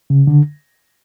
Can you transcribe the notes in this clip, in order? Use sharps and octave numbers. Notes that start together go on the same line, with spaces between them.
C#3
D3